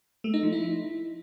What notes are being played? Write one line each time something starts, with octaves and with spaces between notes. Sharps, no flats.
A3
D#4
F3
E4